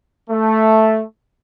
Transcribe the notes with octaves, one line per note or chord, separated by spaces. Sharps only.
A3